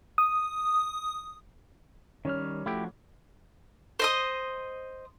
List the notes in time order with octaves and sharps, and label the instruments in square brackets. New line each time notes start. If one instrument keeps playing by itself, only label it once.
[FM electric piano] D#6
[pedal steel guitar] D#3 G3 F6 [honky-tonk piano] C#4 C#5
[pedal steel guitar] F3 F#4 [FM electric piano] A3 [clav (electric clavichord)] E4 G4
[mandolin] C5 D#5 D#6